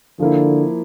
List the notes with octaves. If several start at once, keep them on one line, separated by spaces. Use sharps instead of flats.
D3 F3 A#3 E4